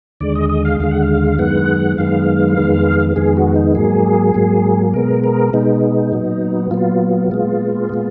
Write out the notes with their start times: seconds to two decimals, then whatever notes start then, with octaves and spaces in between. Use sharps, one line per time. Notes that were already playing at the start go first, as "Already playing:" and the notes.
0.20 D#2 D3 G#3 D5
0.35 D#5
0.49 D#5
0.65 F5
0.80 D#2 D3 G#3 F5
0.91 F#5
1.02 F5
1.38 F#2 D#3 G#3 B3 F#5
1.98 F#2 D#3 G#3 B3 F5
2.57 F2 D#3 G#3 B3
3.16 F2 D#3 G#3 B3 G#4
3.37 F#4
3.55 D#4
3.75 G#2 F#3 A#3 G#4
4.34 G#2 F#3 A#3
4.94 B2 G#3 B3 A#4
5.24 A#4
5.53 B2 G#3 B3 D#4
6.12 A#2 F#3 B3
6.71 A#2 F#3 B3 F4
7.31 A#2 G#3 B3 F4
7.89 A#2 G#3 B3